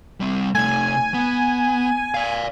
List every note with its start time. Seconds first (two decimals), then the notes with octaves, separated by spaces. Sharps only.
0.20 G3 C4
0.55 C3 A3 G#5
1.14 B3
2.14 D5 F5